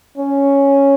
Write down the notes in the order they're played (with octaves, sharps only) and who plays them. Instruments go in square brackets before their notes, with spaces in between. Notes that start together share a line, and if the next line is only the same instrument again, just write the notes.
[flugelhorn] C#4